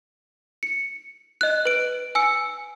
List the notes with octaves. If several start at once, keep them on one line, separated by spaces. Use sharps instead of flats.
C#7
D#5 F#6
B4 D7
G#5 E6 C#7